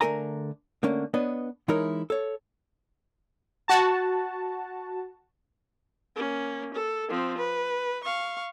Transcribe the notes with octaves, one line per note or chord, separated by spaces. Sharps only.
D3 A3 A4 A#4 G#5 A#5
D3 A3 A#3 C#4
B3 D4 B4 C#5 D#5
E3 G#3 D#4 E4 A#4 C#5
A4 C#5
F#4 A5
A#3 C#4
A4
F3 C4
B4
F5 C#6